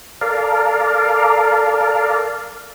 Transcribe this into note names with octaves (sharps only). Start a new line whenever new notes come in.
A4 A#4 D5 F5